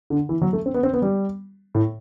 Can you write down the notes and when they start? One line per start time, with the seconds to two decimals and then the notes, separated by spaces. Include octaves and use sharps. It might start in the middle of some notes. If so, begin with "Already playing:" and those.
0.10 D3
0.29 E3
0.42 F#3
0.53 A3
0.66 C4
0.74 B3
0.83 C4
0.93 B3
1.02 G3
1.75 A2